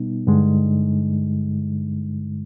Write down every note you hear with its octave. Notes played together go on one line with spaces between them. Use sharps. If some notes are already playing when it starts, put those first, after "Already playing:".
Already playing: B2 G3 B3 D#4
G2 D3 G#3